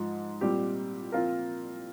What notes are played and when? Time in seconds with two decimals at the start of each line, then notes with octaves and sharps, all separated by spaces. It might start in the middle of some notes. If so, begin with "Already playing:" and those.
Already playing: G#2 F3
0.41 A#2 G3 C4 G4
1.12 A#2 F3 C4 F4 A#4